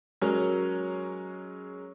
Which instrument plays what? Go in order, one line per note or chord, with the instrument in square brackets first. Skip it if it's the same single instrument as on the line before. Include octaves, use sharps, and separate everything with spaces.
[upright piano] F#3 G#3 C#4 A#4 C#5